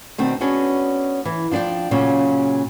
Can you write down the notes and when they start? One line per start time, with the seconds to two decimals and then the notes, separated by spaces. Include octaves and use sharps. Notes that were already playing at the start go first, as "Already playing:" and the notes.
0.18 B2 D#3 C4 D4
0.41 B3 C#4 D4 F#4 G#4
1.25 E3
1.51 F3 D4 C5 D5 G5
1.91 A#2 C#3 F#3 C#4